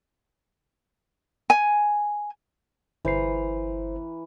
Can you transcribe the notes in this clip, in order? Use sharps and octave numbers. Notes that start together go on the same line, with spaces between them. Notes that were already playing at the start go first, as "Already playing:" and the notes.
G#5
G1 E3 C5 A#5 C7